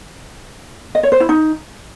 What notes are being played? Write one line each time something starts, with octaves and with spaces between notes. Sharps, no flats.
D#5
C#5
C5
E4
D#4